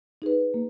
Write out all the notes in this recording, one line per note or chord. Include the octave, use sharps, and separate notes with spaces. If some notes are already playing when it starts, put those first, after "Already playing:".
D#4 G#4 B4
A#3